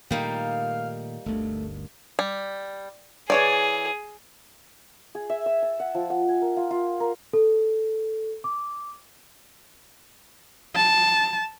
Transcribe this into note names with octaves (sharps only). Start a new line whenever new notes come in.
A#2 D#3 G3 A3 A#3 D#4 F5
G1 D2 A3
G3
E3 G#4 C#5 D5
G#4
E5
E6
A5
F#5
F3
F#5
G#5
A#4
F4
F4
A#4
A4
D6
A5